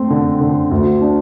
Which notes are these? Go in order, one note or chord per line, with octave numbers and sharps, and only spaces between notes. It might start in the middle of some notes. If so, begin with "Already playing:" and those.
Already playing: A3 C4
D3
D3
D2
D4